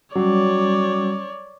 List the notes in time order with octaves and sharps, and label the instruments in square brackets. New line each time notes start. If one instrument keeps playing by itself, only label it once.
[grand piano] F#3 [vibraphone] G3 C#4 [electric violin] C#5 D5